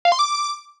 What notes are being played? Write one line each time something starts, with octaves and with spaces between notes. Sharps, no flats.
F5
C6
D6